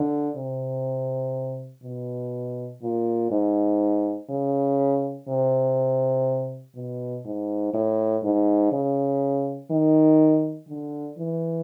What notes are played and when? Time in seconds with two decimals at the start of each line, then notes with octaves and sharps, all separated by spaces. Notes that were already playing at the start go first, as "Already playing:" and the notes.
Already playing: D3
0.37 C3
1.83 B2
2.82 A#2
3.31 G#2
4.30 C#3
5.28 C3
6.75 B2
7.25 G#2
7.73 A2
8.23 G#2
8.72 C#3
9.71 D#3
10.69 D3
11.18 E3